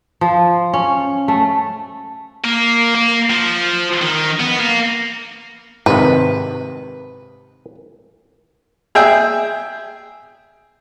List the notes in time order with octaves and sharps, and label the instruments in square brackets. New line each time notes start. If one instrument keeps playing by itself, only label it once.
[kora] F3
C#4
A3
[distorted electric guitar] A#3
A#3
F3
D#3
B3
A#3
[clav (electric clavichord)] G#2 C3 D#3 [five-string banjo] B4
[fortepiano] G#4 E5 G5